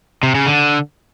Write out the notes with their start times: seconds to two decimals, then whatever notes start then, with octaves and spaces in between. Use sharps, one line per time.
0.23 C3
0.35 C#3
0.47 D3